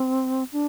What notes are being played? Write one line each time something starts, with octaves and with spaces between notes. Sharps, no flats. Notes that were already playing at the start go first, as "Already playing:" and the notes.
Already playing: C4
D4